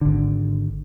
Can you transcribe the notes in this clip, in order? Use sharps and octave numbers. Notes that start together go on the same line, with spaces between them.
G#1 D3